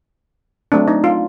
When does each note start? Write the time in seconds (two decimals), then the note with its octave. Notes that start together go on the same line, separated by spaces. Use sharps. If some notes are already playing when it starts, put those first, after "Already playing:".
0.72 F#3 A3 C4 D4
0.88 D#4
1.04 F4